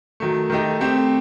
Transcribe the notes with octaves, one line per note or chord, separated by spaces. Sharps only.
D#3 F#3 A3
D#3 A3 D#4 G4
A3 C4 G4